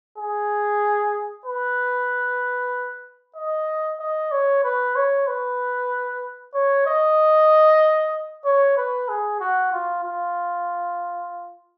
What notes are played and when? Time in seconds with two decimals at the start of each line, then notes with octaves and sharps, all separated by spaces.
0.18 G#4
1.45 B4
3.36 D#5
4.00 D#5
4.32 C#5
4.64 B4
4.96 C#5
5.27 B4
6.54 C#5
6.87 D#5
8.45 C#5
8.77 B4
9.09 G#4
9.40 F#4
9.73 F4
10.04 F4